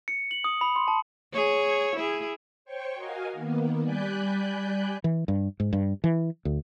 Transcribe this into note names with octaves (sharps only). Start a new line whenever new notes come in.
C#7
F#7
D#6
B5
C6
A5
G#4 C#5
E4 G#4
C5 C#5 G5 C#6
F#4 A#4 D#5 F5 G#5
D#3 A#3 B3
G3 D5 G#5 B5 F#6 G6
E3
G2
G#2
G2
E3
D2